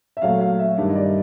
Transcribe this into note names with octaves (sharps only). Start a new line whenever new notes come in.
E5
A#2 F#3 A3 F5
F5
E5
G2 D#3 G3
D#5
D5